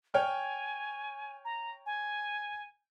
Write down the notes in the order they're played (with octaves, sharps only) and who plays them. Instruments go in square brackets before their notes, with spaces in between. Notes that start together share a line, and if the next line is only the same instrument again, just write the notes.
[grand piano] C#5 G5 F6 [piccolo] G#5
[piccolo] A#5
G#5